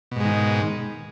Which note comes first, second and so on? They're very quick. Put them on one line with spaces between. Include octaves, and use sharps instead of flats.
B2 G#2 G#3 D#3